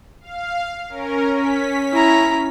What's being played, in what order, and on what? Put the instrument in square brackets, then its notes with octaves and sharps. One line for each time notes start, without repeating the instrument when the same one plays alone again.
[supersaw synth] F5
C#4 A#4
C#4 B6
[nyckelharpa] E4 A#5